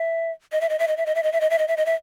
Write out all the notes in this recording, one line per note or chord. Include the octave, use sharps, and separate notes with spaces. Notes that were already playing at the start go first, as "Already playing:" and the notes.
Already playing: E5
D#5
E5
D#5
E5
D#5
E5
D#5
E5
D#5
E5
D#5
E5
D#5
E5
D#5
E5